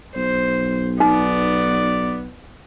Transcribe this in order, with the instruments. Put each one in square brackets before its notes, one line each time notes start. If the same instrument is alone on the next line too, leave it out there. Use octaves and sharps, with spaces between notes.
[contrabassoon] B1 [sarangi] C5
[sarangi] B3 [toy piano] D#4 [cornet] D5